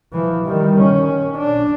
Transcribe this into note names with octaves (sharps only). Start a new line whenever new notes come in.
E3 F3
D#3 G3
C#4
D4